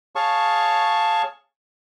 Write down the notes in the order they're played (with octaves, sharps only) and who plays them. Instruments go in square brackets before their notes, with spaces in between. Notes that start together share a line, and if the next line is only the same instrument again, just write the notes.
[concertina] G#4 C#5 F5 A5 C#6